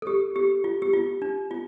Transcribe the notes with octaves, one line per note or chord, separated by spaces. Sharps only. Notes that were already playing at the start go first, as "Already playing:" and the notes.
A4
G4
G4
F4
G4
F4
D4
F4